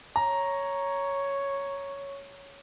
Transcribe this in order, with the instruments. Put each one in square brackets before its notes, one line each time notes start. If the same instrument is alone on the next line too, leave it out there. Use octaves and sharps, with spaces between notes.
[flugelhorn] C#5 [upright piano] A#5